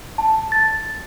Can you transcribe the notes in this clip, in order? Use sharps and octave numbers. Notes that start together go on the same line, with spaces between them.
A5
A6